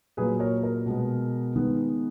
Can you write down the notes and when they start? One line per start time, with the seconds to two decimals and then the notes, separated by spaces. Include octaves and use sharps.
0.17 A#2 F#3 A#3 G#4 B4
0.40 A#4 C#5
0.63 A#4
0.86 B2 G#3 B3
1.56 D#3 G#3 B3